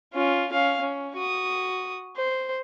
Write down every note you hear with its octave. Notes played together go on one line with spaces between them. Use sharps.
C#4 F4
C#4 F5
C#4
F#4 D#6
C5